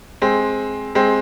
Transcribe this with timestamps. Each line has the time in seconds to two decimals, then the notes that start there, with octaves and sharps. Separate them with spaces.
0.22 G#3 C4
0.95 G#3 C4